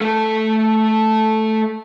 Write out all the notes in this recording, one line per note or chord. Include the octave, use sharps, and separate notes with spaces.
A3 A4